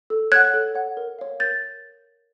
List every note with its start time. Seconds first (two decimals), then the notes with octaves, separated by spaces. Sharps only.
0.10 A4
0.32 C#5 F#5 F#6 G#6
0.54 A4
0.75 C#5 F#5
0.97 A#4
1.19 C#5 F5
1.40 A#4 G6 A6